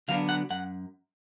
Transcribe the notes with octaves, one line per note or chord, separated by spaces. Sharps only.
D3 F#3 B3 D4 F5
F#5
F#2 F#5